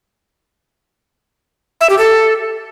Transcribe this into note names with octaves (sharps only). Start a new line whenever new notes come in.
E5
G4
A4